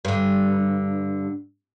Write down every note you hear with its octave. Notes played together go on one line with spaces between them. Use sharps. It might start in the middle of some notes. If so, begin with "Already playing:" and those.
G2 D3